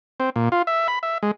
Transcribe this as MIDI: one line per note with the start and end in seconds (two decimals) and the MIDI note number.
0.20 0.30 60
0.36 0.49 46
0.52 0.62 65
0.67 0.87 76
0.88 0.99 83
1.03 1.18 76
1.23 1.31 56